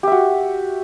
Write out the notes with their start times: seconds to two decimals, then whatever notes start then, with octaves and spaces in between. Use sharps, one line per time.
0.03 G4
0.07 E5
0.12 F#4